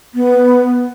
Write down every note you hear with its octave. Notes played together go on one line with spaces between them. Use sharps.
B3